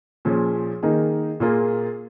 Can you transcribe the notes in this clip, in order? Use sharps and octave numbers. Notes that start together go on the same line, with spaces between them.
A#2 F3 C#4 G#4
D#3 A#3 D#4 G#4
A#2 A#3 F4 G#4